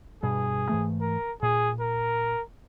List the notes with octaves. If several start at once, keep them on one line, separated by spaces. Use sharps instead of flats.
G2 B2 G#4
G#2 E3 A3
A#4
A#2 G#4
A#4